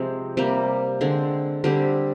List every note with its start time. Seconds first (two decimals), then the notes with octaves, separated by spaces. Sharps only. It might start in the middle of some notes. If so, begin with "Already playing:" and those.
Already playing: C3 F3 G#3 C4
0.37 C3 G3 A#3
1.01 D3 G#3 C4
1.64 D3 G3 C4 G4